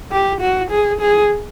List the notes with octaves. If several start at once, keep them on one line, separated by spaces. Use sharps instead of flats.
G4
F#4
G#4
G#4